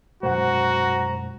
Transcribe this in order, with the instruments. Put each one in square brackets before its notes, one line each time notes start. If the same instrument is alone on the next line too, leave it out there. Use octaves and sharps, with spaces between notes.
[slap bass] F#2 B2 G#3 [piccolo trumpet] F#4 [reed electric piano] C5 F#5 [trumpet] A#5